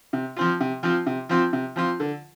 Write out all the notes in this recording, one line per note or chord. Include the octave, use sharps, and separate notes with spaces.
C3
F3 C4 F4
C3
F3 C4 F4
C3
F3 C4 F4
C3
F3 C4 F4
D3